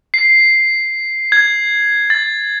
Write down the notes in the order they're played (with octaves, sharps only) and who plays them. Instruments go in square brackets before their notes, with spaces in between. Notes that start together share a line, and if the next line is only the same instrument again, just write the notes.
[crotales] C7
G#6
A6